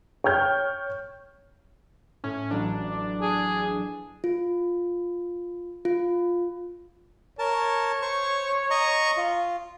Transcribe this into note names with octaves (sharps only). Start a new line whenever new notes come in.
C#5 G5 F6 G6
A2 C#4
A1 F#3 D4 A#5
G#4
F4
F4
A#4 C#5 A5
C5 C#6
D#5 A#5 C#6
F4